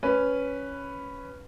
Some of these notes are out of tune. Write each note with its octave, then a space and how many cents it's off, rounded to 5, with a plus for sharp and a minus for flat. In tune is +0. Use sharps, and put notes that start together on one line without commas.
C#4 +0 B4 +5